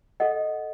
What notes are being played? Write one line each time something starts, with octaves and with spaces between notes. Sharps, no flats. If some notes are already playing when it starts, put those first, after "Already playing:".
A4 D#5 F#5